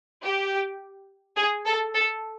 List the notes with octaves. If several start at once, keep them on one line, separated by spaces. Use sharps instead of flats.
G4
G#4
A4
A4